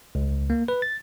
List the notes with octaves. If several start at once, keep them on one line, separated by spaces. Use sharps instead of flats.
C#2
A#3
B4
A6